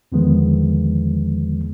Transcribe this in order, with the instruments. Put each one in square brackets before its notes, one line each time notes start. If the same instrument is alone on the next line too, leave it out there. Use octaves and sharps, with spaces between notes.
[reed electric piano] E2 D3 D#3 F3 G#3 B3